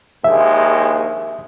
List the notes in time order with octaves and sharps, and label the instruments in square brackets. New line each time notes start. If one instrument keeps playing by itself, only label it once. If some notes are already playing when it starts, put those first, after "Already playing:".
[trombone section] A#1 D#2 G#3 [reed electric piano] E5